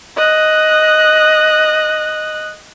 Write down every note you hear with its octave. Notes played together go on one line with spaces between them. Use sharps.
D#5 F#6